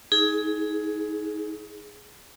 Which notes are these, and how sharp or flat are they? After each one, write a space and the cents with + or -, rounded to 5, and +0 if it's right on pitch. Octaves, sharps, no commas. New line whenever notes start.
D#4 +30 G#4 +10